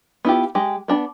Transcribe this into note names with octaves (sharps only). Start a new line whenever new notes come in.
B3 E4 F4 G4
G#3 G4
B3 D4 A#5 B5